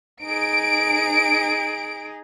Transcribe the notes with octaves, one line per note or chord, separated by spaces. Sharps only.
D#4 G#4 D7